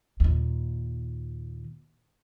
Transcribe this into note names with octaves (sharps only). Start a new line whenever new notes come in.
D#2 A#2